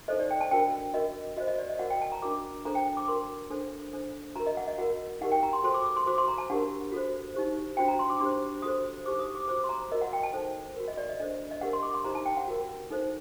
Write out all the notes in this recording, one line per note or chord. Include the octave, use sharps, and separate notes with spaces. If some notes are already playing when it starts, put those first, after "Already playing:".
D#4 A4 C5 D#5
D5
G5
A5
D4 F#4 A#4 G5
F#4 A#4 D#5
F#4 C5 D#5
D#5
D5
D#5
F#4 A#4 F#5
G5
A5
A#5
D4 F#4 A#4 D6
D4 A4 C5 A#5
G5
D6
F#4 A#4 C6
D4 A4 C5
D4 A4 C5
F#4 A#4 A#5
D#5
F#5
D#5
F#4 A#4 F#5
D#4 G4 A#4 F#5
G5
A#5
C6
F#4 A4 C5 C6
D6
D6
C6
F#4 C5 D6
C6
A#5
A5
D4 G4 A#4 F#5
F#4 A4 C5
D#4 G4 C5
D4 F#4 C5 G5
A#5
C6
D6
D4 G4 C5 C6
F#4 A4 C5 D#6
D#4 G4 C5 D6
D#6
D6
F#4 C5 D6
C6
A#5
F#4 A#4 D#5
F#5
G5
A5
D#4 A4 C5
F#4 A#4
D#5
D5
D#5
D4 A4 C5 D#5
D#5
D#5
D4 G4 A#4 F#5
C6
D6
C6
D#4 G4 C5 A#5
A5
G5
F#5
F#4 A#4
D#4 A4 C5